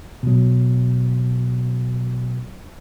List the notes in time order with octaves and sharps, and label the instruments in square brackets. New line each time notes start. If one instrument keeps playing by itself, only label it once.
[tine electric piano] B2 F#3